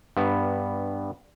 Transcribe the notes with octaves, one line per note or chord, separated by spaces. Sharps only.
G2 B3